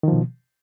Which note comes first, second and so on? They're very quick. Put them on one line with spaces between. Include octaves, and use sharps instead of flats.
D#3 F3 B2